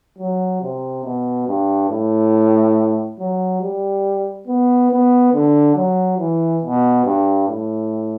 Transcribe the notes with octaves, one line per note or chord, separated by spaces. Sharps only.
F#3
C3
B2
G2
A2
F#3
G3
B3
B3
D3
F#3
E3
B2
G2
A2